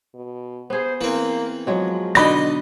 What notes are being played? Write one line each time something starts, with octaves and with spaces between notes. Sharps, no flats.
B2
B3 G#4 C5
E3 A#3 C4
F3 F#3 G#3
B2 D3 B3 D4 D#4 B5 C6 A#6